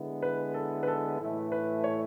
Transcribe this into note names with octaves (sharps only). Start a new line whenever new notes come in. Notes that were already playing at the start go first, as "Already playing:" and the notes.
Already playing: D3 G#3 B3 E4
B4
A4
B4
A4
A2 E3 A3 E4
B4
C#5